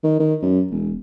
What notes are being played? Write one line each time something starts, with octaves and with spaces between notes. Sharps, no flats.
D#3
D#3
F#2
E1